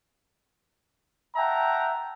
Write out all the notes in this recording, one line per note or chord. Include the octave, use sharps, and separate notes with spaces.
E5 F#5 G5 A5 A#5